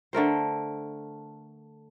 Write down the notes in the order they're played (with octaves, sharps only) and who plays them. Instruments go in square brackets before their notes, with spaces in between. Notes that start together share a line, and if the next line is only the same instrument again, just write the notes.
[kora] D3 A3 A#4 C5